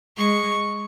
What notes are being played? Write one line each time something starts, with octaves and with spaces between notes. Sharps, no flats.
G#3 C#6